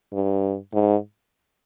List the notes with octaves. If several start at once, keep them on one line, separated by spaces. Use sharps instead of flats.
G2
G#2